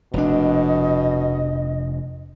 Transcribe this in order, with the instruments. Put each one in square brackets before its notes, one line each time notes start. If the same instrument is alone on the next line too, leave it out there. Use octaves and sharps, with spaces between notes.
[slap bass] F1 D4 [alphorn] B2 [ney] D#5